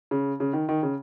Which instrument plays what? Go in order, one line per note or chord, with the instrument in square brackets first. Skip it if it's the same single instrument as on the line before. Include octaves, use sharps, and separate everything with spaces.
[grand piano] C#3
C#3
D#3
D#3
C#3